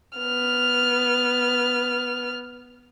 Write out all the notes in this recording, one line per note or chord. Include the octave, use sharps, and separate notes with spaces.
B3 F6